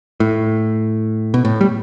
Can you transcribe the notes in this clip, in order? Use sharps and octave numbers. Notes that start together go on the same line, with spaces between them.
A2
B2
A2
G3